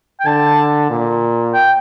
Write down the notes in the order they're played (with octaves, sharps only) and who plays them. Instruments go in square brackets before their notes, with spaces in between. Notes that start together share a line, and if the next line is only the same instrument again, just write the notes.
[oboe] G5
[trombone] D3 [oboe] A5
[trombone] A#2
[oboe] G5